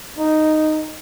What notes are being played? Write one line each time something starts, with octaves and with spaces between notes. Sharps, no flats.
D#4